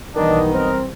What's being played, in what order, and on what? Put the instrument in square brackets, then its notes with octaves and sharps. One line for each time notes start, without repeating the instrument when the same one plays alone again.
[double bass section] B1 E3 G3 [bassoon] D#3 [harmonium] B3 D#4 D#5 [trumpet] D4
[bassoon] C4 [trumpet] A#4